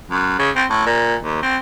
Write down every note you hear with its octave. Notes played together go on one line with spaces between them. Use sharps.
F#2
C#3
C4
A2
A#2
D#2
C4